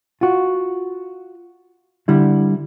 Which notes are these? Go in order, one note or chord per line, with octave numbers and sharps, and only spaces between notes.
F4 F#4
D3 G3 E4